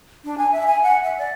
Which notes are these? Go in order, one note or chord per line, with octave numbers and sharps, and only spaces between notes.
D4
G#5
E5
G#5
F#5
E5
D5